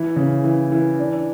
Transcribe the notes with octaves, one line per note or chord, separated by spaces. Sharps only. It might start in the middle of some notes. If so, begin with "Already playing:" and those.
Already playing: E3
C#3
E3
E3
D4